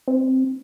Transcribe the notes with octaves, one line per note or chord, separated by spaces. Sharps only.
C4